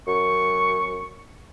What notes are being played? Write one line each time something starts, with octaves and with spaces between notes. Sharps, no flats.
F#2 C#6